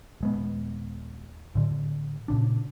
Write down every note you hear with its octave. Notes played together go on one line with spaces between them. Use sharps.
D#1 G#3 B3
A2 D3
A#2 C#3 D4